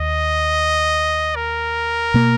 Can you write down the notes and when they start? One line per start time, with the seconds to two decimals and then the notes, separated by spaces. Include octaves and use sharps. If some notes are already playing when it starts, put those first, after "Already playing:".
Already playing: D#2 D#5
1.36 A#4
2.14 B2 A#3